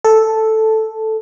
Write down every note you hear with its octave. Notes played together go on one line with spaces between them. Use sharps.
A4